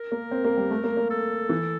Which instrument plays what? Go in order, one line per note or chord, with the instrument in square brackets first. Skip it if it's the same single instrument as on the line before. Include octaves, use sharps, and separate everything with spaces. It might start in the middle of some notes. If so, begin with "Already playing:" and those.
Already playing: [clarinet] A#4
[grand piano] A#3
C4
A#3
G3
A3
A#3
A#3
[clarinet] A4
[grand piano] E3